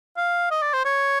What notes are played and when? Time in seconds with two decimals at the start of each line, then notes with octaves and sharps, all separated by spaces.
0.17 F5
0.51 D#5
0.62 D5
0.73 C5
0.85 C#5